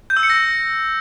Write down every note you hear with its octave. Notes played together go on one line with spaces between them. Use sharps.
G6
E6
C#7
A#6